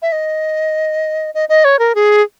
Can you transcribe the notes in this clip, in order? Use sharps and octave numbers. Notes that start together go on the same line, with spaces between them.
E5
D#5
D#5
D#5
C#5
A#4
G#4